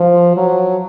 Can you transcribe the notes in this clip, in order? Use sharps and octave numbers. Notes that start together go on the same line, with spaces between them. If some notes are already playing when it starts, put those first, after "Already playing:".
Already playing: F3
F#3